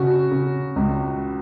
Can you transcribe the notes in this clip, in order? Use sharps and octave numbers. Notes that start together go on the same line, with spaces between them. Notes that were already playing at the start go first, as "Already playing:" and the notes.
Already playing: C#3 F#4
C#3
C#2